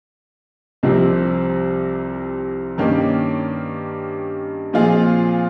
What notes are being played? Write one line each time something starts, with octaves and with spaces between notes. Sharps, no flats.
C2 C3 F3 C4 G4
G2 D#3 A#3 C#4 G4
A#2 F3 C4 F4 G#4